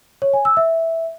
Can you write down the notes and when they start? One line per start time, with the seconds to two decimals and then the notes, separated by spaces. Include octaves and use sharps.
0.22 C#5
0.33 G#5
0.45 E6
0.57 E5